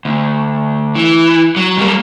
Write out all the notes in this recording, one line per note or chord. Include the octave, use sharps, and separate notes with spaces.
D2
E3
F#3
G3 A#3